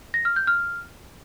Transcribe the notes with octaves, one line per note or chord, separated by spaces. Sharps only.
A#6
F6
G6
F6